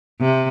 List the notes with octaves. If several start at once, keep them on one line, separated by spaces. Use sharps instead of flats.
C3